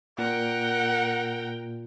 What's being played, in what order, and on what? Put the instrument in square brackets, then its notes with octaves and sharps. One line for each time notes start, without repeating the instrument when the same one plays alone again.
[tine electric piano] A#2 [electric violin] A#4 G5 [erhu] F#5